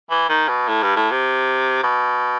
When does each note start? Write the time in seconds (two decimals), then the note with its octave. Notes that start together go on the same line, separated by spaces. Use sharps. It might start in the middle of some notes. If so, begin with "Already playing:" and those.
0.10 E3
0.29 D#3
0.49 B2
0.68 A2
0.83 G2
0.96 A2
1.11 C3
1.83 B2